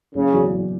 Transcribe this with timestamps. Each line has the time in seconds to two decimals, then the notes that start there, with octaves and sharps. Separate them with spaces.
0.14 F#1 C#3
0.33 E2 B2 F#3
0.53 F#1